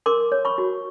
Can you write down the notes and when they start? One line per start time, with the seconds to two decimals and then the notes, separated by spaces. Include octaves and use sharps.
0.06 A#4 C6 D6
0.32 C#5
0.45 B5 C#6
0.58 F#4